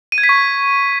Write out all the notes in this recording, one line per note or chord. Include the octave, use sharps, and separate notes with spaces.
D#7
G#6
B6
C#6